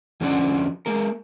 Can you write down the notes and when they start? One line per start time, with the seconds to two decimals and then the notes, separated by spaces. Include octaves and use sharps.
0.21 F2 D3 F3 C#4 D5 F#5
0.86 G#3 A#3 A#4